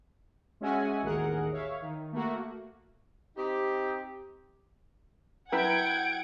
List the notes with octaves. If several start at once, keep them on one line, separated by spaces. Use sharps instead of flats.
G#3 C#4 F#4 E5 F#5 G#5
A1 D#2 G#4 A#4 F#5
C#5 E5 F5
D#3
A3 A#3 F#4
C4 D#4 G4
F#3 E4 B4 F#5 G5 G#6 D7